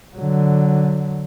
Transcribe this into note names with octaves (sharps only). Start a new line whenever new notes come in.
D3 F#3